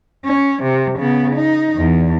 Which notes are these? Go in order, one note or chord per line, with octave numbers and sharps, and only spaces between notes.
C#4
C3
C#3 B3
D#4
E2